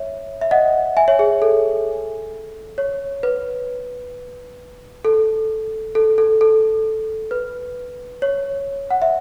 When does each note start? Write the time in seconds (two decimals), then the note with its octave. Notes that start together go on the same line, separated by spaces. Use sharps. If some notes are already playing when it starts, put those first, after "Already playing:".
Already playing: C#5 E5
0.41 E5
0.51 D#5 F#5
0.97 E5 G#5
1.08 C#5 E5
1.19 G#4
1.42 A4
2.78 C#5
3.23 B4
5.05 A4
5.95 A4
6.18 A4
6.41 A4
7.31 B4
8.22 C#5
8.91 F#5
9.02 E5